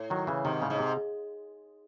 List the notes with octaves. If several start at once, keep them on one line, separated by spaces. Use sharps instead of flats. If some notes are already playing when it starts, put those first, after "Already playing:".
Already playing: A2
D#3 F#3
C#3 E3
G#2 C3 D#3
A2 C#3
G#2
C3